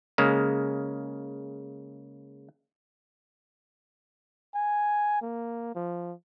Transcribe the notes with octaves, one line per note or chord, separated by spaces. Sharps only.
C#3 G#3 A#3
G#5
A#3
F3